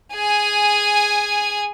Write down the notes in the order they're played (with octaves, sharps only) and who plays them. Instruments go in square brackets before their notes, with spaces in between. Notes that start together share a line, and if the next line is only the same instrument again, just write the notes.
[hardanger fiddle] G#4 G#5